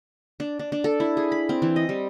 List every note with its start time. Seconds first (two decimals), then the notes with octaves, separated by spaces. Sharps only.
0.40 D4
0.59 D4
0.72 D4
0.84 A4
1.00 E4
1.17 G#4
1.32 B5
1.49 C4
1.62 E3
1.76 D#5
1.89 G3